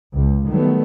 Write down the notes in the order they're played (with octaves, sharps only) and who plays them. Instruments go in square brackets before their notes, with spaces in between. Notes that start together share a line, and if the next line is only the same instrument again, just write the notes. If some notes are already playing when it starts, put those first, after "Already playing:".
[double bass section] C#2
D#3 F#3 G3 A3 B3